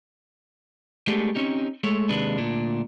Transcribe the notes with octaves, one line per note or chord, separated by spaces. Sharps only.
G#3 A3 B3 D4 G4 G#4
C4 C#4 D#4 G4
G#3 A3 C#5
D#2 C3 G#3 D4 B4
D2 A#2 D4